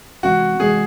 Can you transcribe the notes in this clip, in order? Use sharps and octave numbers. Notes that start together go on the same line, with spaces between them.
C3 E3 G#3 C4 F#4
C3 E3 G#3 C4 G#4